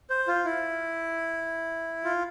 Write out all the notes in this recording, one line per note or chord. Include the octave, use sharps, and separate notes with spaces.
C5
F4
E4
F4